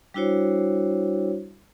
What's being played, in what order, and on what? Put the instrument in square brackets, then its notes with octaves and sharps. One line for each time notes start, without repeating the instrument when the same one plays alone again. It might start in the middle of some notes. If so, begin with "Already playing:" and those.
[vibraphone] G3 D4 E4 F#4 C5 C#5